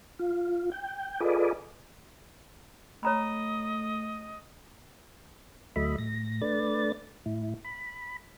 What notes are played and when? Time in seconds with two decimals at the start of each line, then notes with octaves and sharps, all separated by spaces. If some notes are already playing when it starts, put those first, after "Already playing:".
0.19 F4
0.72 G5
1.20 F4 G#4 A4 B4 D5 D#5
3.03 A3 C#5 D#5 A#5 B5
5.76 D2 F#3 A3 D#5 E5 B5
5.98 A2 A#6
6.41 A3 D4 B4 D5 A6
7.26 A2 E4
7.64 B5